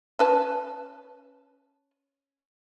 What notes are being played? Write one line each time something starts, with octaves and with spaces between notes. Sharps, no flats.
C#4 B4 A5